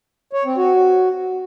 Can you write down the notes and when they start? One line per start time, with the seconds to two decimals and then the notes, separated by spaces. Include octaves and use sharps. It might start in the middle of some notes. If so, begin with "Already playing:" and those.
0.33 C#5
0.45 C4
0.57 F#4